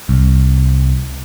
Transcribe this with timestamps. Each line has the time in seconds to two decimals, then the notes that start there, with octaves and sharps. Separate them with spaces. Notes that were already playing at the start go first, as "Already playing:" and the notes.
0.09 C2